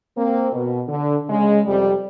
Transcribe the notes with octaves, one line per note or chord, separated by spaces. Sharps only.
A#3 C4
B2
D3
C#3 G#3
F2 C3 G3